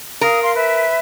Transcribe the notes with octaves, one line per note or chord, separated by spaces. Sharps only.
A#4 F5 D#6
F5 C6
B4 E5